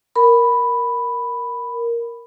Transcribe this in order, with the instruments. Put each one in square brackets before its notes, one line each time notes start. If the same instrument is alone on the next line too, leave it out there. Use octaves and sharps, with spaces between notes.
[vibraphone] A#4 B5